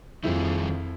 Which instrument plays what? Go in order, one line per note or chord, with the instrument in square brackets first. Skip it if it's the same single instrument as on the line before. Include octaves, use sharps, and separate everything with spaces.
[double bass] F2 [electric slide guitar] D#3 G3 G#4 [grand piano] F3 E4